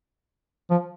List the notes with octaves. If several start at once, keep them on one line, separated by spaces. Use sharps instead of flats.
F3